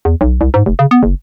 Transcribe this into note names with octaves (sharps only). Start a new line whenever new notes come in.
E2
B1
C2
G#2
F1
C#3
B3
F#1